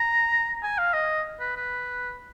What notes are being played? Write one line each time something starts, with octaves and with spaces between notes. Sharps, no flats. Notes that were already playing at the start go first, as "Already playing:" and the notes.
Already playing: A#5
G#5
F5
D#5
B4
B4